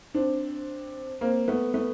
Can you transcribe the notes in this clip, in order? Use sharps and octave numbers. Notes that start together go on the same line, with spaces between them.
C4 D4
A#3 C4
A3 B3
A3 B3